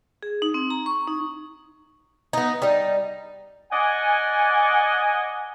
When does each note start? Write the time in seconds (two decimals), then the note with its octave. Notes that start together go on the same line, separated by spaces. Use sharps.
0.23 G#4
0.42 D#4
0.54 C4
0.71 A#5
0.86 C#6
1.08 D#4
2.33 B3 D#4
2.62 G3 D#4
3.72 D5 D#5 F#5 G#5